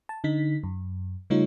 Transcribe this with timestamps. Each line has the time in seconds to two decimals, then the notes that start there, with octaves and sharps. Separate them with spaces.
0.09 A5
0.24 D3 D#4 B6
0.63 F#2
1.30 C#3 G3 A3 D#4 F4 C#5